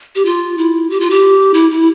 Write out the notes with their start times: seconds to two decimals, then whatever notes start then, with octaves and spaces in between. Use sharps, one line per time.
0.15 G4
0.25 F4
0.58 E4
0.90 G4
1.00 F4
1.10 G4
1.54 E4
1.71 E4